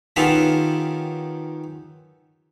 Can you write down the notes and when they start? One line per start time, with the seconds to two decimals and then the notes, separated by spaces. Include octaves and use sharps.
0.16 D#3 B3 C#4 F4 G4 A4